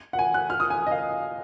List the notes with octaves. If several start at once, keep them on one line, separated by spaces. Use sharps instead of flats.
F#5
G#5
F#6
F6
D#6
G#5
D#5
F5